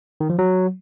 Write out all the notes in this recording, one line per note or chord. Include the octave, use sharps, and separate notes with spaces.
D#3
F3
F#3